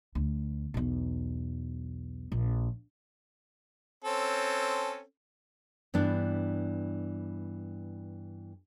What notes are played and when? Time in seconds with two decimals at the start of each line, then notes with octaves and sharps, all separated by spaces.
0.15 D2
0.74 B1 E2
2.32 A#1
4.04 C4 C#4 A4
5.94 G2 E3 B3 D4